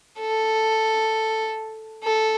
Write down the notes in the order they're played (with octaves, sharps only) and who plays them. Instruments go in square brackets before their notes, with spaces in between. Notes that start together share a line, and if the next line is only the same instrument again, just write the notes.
[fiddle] A4
A4